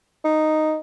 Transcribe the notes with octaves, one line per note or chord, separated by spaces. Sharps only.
D#4